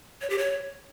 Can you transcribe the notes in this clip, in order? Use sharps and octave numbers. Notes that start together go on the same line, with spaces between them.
C#5
G4
C#5